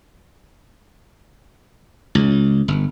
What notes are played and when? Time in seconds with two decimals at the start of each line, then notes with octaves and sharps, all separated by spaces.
2.15 C#2
2.68 G1